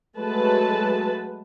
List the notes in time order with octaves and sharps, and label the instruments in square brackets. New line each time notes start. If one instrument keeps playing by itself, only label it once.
[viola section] F#3 G#3 A3 B4 A5